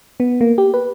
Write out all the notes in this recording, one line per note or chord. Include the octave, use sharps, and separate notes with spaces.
B3
A#3
G4
B4